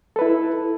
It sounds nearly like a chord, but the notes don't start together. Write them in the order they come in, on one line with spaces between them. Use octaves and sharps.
A4 B4 E4